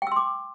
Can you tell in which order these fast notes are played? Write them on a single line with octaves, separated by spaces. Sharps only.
G5 E6 C6 D6